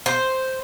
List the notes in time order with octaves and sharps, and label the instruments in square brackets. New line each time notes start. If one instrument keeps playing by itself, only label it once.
[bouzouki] C5